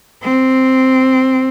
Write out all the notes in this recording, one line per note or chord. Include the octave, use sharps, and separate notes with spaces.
C4